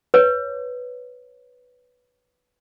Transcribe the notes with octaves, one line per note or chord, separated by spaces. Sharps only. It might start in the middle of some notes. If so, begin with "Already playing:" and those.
B4 C#5